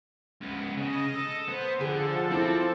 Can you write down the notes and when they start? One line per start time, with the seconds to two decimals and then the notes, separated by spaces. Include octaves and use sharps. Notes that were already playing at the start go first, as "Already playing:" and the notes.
0.41 C#2 B3
0.77 C#3 D#5
1.15 A4
1.48 B3 B4 C5
1.81 D3 F3 G#4 A4 F#5
2.31 C4 E4 D6